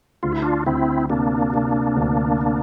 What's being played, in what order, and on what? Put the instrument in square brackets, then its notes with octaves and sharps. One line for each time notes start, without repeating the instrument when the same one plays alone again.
[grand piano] D2 [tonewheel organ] F4
[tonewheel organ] E4
D4 F4
[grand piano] D2 [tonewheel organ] C4 E4
[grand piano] C3 [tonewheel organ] A#3 D4
[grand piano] C3
D2